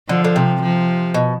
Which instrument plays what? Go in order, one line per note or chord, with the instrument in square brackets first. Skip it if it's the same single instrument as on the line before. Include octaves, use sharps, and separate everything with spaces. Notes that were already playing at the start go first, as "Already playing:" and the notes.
[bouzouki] D3 [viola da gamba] F3
[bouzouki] D3
C3
[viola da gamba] F3
[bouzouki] B2